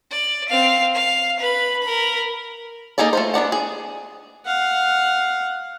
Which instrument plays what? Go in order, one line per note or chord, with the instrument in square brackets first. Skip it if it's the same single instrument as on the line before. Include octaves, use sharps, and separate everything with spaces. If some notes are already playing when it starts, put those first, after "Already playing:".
[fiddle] D5
C4 F5
F5
B4 B5
A#4 B5
[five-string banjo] A#3 D#4 G#4 A4 D5
A3 F4 C5
B3 D4 D5 F#5
G#4
[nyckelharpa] F5 F#5